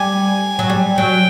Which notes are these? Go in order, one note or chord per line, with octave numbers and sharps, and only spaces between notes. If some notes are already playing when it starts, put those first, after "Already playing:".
Already playing: G3 G#5
F#3
G3
F#3 G5